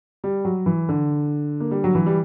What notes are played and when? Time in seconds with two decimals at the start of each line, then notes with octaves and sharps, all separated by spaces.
0.24 G3
0.45 F#3
0.66 E3
0.89 D3
1.60 A#3
1.71 G3
1.84 F#3
1.95 E3
2.06 G3